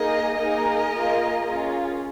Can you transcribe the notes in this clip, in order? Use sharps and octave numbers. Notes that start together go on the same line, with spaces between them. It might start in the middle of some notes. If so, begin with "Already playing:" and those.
Already playing: A#3 D#4 G#4 A#4 D#5
A#3 D#4 G#4 A#4 D#5
A#3 F4 G#4
C#4 F4 G#4